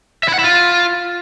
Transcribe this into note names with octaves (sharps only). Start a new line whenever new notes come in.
E5
E4
F#5
E4
F4